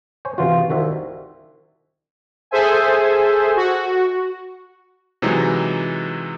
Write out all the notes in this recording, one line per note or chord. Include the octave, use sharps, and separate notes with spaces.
C5 C#5 G#5
C3 E3 F4 F#4
C2 D#3 F#4 E5
G#4 A4 C5 E5 G#5
F#4
C3 E3 F#3 G#3 D#4